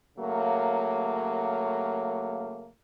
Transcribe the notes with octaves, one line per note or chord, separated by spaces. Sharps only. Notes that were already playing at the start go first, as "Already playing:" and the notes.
C#3 F#3 A3 A#3